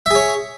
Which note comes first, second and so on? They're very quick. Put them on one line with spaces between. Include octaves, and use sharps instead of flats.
E5 G#4 C#5